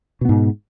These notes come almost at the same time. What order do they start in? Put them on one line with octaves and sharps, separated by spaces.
B2 B3 G#2